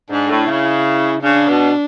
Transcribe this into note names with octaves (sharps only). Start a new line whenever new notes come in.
G#2 D4
A2
C#3 E4
C#3 D4
B2